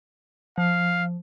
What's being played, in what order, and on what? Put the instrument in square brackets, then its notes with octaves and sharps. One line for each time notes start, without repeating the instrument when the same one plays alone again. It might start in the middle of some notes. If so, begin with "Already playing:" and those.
[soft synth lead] F3 [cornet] F5